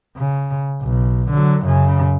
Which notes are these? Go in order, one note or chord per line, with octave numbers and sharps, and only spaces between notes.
C#3
B1
D3 F#3
F#2 C#3